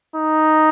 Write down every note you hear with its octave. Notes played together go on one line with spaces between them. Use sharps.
D#4